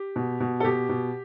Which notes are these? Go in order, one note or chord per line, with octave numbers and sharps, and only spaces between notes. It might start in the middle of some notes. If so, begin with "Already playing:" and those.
Already playing: G4
B2
B2
A4
B2 G4
B2